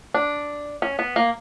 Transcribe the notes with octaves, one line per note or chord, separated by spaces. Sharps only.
D4
C#4
B3
A#3